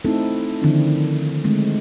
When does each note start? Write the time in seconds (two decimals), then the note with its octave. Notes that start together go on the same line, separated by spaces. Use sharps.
0.05 A3 C4 D#4 E4 A4
0.62 D3 D#3 F3 C4 D4 E4
1.44 D3 G#3 A3 C4